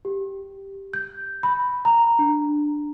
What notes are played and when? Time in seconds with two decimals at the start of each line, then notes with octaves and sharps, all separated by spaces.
0.05 G4
0.93 G6
1.43 B5
1.85 A#5
2.19 D4